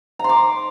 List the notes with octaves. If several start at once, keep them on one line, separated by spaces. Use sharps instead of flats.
A#5 C6 D6